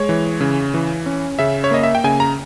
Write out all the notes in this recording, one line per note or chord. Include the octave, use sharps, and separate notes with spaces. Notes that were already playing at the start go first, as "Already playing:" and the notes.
Already playing: G#3 C#5
E3
C#3
E3
C#4
C#3 E5
C#5
A#3 D#5
E5
G5
C#3 G#5
A#5